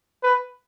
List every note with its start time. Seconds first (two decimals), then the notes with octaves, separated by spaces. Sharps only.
0.23 B4